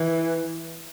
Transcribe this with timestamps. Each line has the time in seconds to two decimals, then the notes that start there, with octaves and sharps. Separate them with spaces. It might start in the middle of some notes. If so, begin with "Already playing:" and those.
Already playing: E3